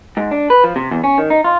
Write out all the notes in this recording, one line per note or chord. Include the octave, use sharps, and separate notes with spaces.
G#2
D4
B4
F3
C3
E2
C#4
D#3
D#4
F4